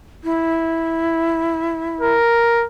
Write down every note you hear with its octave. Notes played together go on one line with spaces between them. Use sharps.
E4
A#4